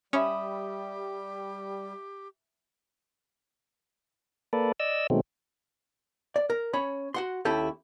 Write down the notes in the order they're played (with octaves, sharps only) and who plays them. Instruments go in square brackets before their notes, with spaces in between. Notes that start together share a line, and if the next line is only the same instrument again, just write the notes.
[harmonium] G3 [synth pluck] C#4 [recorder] G4 [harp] E5 B5 D#6
[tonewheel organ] A#3 A4 B4 D5
D5 D#5 E6
B2 D#3 F#3 G#3 A3 C4
[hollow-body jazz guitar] D5
A#4
C#4 C#5 B5
F#4 F#5 C6
D#2 C#4 E4 G4 A4